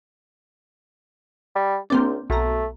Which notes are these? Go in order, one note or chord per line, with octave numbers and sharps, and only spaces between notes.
G3
C#2 A#3 C4 D4
B1 A3 A#5